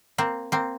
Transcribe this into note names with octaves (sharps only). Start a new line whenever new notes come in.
A#3 C4
A#3 C4